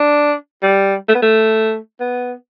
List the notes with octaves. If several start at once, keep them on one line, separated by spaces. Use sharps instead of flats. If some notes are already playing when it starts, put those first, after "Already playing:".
Already playing: D4
G3
A3
B3
A3
B3